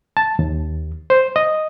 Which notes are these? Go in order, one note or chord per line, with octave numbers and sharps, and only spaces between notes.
A5
D#2
C5
D#5